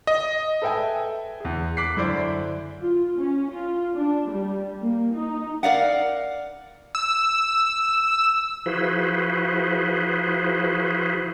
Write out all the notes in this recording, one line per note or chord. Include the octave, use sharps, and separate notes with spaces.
D#5
A4 B4 E5 G5 G#5
E2 G#4
D6 F#6 B6 C7
F#2 D3 E4 C5 D5
F4
C#4
F4
D4
G3
A#3
D#4
A#4 D5 F5 F#5
E6
F3 E4 F#4 G#4 B4 C5